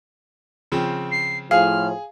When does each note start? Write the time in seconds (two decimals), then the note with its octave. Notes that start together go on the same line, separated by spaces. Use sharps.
0.72 C#3 F3 C4
1.11 C7
1.51 A2 F3 G#4 F5 F6